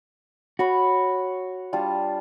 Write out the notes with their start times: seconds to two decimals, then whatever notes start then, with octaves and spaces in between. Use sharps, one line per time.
0.59 F#4 C#5 B5
1.73 G3 D4 F4